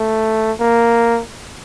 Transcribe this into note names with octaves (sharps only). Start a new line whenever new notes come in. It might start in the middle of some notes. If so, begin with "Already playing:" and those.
Already playing: A3
A#3